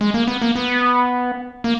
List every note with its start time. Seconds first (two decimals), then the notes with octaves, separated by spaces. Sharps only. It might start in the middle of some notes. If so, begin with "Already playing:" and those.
0.01 G#3
0.14 A#3
0.28 B3
0.42 A#3
0.55 B3
1.64 A#3